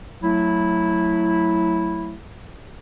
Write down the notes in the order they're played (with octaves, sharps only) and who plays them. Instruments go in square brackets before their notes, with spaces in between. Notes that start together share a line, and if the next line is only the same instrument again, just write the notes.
[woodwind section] F#3 A3 E4